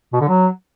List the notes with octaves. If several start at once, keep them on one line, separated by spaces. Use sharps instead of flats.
B2
D3
F#3